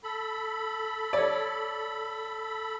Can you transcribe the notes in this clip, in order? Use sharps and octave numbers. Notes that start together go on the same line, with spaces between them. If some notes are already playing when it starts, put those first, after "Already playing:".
A4 B5
C#5 D5